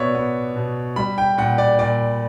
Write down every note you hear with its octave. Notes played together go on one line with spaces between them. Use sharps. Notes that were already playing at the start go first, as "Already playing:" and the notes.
Already playing: B2 B3 C#5 D5 E5
B3
B2
G3 B5
G5
A#2 F#5
D5
A#2 D5